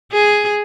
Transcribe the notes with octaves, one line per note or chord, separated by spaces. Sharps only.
G#4